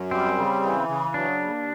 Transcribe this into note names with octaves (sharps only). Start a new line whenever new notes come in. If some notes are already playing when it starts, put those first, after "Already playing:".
Already playing: F#2
G3 C4
C#3
E3
C#3
F#3 D4
D#2